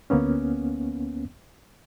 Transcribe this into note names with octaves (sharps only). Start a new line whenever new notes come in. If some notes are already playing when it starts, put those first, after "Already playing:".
D2 A#3 B3 C#4